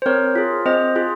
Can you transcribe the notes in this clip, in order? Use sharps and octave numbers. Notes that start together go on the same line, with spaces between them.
C5
C4 A#4 C#5
F4 G#4
C4 C5 D#5
F4 G#4